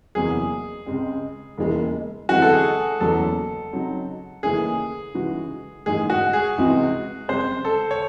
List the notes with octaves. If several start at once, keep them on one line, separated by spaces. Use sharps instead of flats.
F#1 E2 C3 F#3 G#4
C#2 C#3 G#3 C4
E1 D#2 C#3 E3 G#3
F#2 E3 G#3 C4 F#4
A4
G#4
F#1 E2 C#3 F#3 A4
C#3 F#3 C4 D#4
D#2 C#3 E3 A3 C#4 G#4
C#3 E3 G#3 D#4 F#4
A1 G#2 D#3 G#3 G#4
F#4
G#4
C#2 C3 E3 C4 F#4
F#2 C#3 G#3 C4 C5
A4
C#5